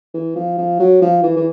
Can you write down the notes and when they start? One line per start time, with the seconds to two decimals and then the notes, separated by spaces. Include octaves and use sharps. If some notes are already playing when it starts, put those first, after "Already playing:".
0.14 E3
0.35 F3
0.58 F3
0.80 F#3
1.02 F3
1.23 E3
1.37 E3